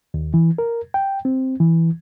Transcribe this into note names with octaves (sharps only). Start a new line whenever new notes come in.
D#2
E3
A#4
G5
C4
E3